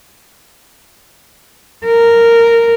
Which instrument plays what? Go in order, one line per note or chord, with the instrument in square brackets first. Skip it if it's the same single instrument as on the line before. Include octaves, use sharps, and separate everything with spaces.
[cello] A#4